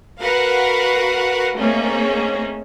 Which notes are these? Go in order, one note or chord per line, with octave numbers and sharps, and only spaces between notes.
F#4 A#4 B4 F5 F#5
A3 A#3 C4 C#4 D#4 G#4